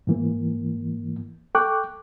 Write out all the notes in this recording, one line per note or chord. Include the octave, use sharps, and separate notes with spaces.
G#2 E3 A#3
A4 G5 C#6 D6 F#6